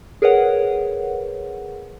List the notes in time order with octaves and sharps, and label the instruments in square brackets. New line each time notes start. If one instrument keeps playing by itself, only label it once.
[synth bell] G#4 A#4 B4 C#5 F#5